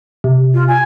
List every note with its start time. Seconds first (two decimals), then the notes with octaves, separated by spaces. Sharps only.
0.24 C3
0.53 F4
0.68 G#5